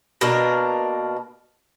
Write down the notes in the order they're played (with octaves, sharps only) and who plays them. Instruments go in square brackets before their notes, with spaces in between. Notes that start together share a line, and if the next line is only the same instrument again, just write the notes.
[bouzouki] B2 A#3 D4 A#4